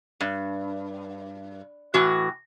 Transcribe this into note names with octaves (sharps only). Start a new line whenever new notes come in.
G2
A2 E3 F#4